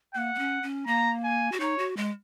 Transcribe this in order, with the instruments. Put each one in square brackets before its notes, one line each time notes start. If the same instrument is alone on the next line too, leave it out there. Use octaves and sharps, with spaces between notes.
[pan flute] A#3 [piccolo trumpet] F#5
[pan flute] A#3
C#4
C#4
[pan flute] A#3 [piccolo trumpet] A#5
[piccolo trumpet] G#5
[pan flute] F#4
[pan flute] D#4 [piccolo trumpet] C#5
[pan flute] F#4
G#3